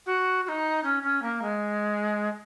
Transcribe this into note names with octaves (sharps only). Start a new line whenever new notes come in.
F#4
F#4
D#4
C#4
C#4
A#3
G#3